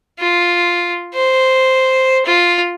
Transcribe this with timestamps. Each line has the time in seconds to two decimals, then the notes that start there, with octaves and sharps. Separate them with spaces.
0.19 F4
1.14 C5
2.25 F4